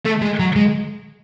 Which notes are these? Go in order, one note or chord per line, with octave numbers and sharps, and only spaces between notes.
A3
G#3
F#3
G#3